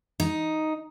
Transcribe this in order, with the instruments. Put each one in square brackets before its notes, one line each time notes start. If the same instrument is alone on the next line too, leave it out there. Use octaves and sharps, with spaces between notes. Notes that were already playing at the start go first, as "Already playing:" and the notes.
[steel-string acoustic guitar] D#4